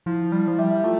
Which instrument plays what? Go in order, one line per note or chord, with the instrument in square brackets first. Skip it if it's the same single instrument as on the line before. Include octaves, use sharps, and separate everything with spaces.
[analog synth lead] F3 [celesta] E4
[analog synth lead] G3 [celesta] E4
[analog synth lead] F3
[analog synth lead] G3 [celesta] E5
[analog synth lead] A3 [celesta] F4